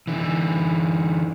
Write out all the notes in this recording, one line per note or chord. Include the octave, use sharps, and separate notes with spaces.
D3 E3